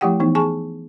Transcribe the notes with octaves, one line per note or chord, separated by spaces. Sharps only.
F3 A3 E4 G4 F#5 G5
E3 B3 D#4
G#4 G#5 A5 C#6